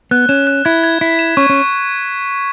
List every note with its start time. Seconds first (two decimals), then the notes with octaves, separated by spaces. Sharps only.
0.11 B3 F#6
0.29 C#4 E7
0.47 F#6
0.65 E4 G#6
0.84 G#6
1.01 E4 B6
1.19 E7
1.37 C#4 C#6
1.50 C#4